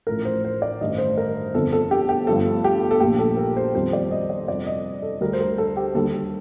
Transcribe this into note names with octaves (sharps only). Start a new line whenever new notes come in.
A1 A2 F3 A3 A#4
C5
C5
D5
A1 G2 D#3 G3 D#5
C5
A#4
G1 F2 D3 A4
A4
G4
G4
G1 G2 F3 A3 A4
G4
A4
A#1 A#2 F3 A3 G4
A4
A#4
C5
F2 D#3 G3 C5
D5
D#5
D5
F2 C3 G3 D5
D#5
A4
D2 D3 G3 A#4
C5
A#4
A4
G4
D#2 D3 G3 A4